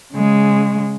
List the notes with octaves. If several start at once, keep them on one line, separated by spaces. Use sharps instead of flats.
C#3 G#3